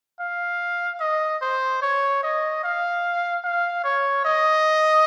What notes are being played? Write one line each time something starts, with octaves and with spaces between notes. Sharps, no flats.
F5
D#5
C5
C#5
D#5
F5
F5
C#5
D#5